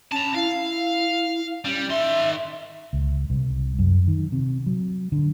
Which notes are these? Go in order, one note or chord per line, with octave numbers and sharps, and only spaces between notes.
C#4 A5 A#5
E4 F5
G3 C#4
D#3 E5 C6
C#2
C2
F#2
D#3
C3
F#3
D3